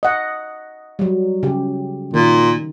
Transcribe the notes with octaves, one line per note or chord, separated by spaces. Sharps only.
D#5 F#5
F#3 G3
C#3 G4
A#2 D#3